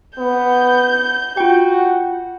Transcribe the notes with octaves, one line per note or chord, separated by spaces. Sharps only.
B3 G6
F4 F#4 G5